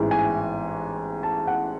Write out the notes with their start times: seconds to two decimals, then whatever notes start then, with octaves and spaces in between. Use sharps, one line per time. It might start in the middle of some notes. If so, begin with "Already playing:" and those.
Already playing: A1 G#2 E3
0.11 G#5
1.23 A5
1.47 F#5